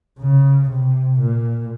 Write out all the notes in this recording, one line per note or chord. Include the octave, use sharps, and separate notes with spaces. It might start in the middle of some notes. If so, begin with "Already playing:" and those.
C#3
C3
A#2